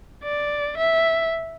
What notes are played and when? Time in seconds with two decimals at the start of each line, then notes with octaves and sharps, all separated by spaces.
0.24 D5
0.78 E5